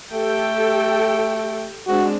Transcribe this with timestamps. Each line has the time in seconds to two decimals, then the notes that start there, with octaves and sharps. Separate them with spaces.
0.13 A3 G4 A4 G5
1.87 G#3 C4 D4 F#4